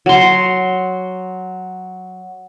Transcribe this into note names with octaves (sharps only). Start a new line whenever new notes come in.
F#3 C6